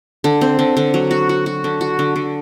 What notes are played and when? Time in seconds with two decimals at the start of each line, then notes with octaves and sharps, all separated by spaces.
0.24 D3
0.41 C4
0.59 D3
0.77 D3
0.94 F#3
1.11 F#4
1.29 F#4
1.46 F#4
1.64 D3
1.81 F#4
1.99 D3
2.16 D3